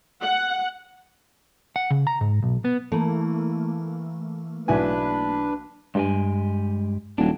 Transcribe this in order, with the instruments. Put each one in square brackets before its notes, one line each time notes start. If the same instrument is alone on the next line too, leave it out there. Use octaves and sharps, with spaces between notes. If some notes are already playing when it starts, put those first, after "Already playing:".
[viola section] F#5
[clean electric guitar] F#5
C#3
A#5
G#2
B1
B3
[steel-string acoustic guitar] E3 [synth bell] A3 A#3
[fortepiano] B1 E4 G#5 [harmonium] D4 B4
[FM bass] G2 [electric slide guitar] G#3 G4 G#5
[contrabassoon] D#1 [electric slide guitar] F#3 D4